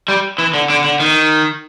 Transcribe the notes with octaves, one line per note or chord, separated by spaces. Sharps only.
G3
E3
D3
D3
D3
D#3